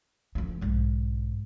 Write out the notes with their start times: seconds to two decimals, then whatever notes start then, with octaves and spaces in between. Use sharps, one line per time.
0.35 D2 F3
0.61 B1 G#2